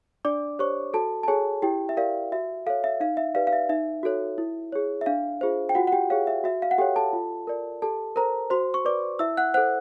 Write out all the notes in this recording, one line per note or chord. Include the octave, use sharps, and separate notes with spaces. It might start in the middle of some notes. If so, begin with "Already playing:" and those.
D4 D5 D6
G4 C5 C#5 C#6
F#4 A4 A5
A5
G#4 A4 C#5 G#5
E4 G4 G5
E5
G4 A#4 D5 F5
F#4 E5
A4 C#5 F5
E5
D#4 F5
E5
G4 B4 D5 F5
F5
E5
D#4 E5
F#4 A4 C#5
E4
G#4 C#5
E5
D4 F5
F4 G#4 C5
G5
F4 F#4 F#5
F#5
G4 G5
G#4 C#5 F5
E5
F#4 E5
F5
F#5
G4 A4 C#5 G5
A4 A5
F4
A#4 D5
G4 A4 A5
A#4 C5 A#5
F#4 C5 C6
C#6
B4 D5 D6
E4 E5 E6
F#5 F#6
A4 C5 F#5 F#6